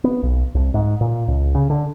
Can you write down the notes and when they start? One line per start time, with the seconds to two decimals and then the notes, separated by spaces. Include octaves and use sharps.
0.04 B3
0.23 B1
0.55 C2
0.74 G#2
1.01 A#2
1.28 C#2
1.55 C#3
1.70 D3